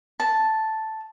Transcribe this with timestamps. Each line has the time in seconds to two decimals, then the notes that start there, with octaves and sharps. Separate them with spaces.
0.20 A5